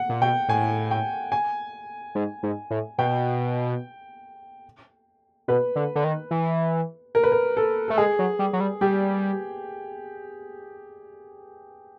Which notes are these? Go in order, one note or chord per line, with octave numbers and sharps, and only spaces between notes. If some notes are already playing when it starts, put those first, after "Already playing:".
Already playing: F#5
A#2
B2 G5
A2 G#5
G5
G#5
G#2
G#2
A2
B2 G5
B2 B4
D3
D3
D#3
E3
A#4
B4
A#4
A4
A3 A4
G#3 G#4
F#3
G3
F#3
G3
G3 G4